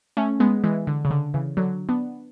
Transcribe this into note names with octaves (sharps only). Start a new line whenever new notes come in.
A3 C#4
G#3 B3
E3 G#3
D3
C#3
D3
C#3 E3
D3 F#3
B3 D4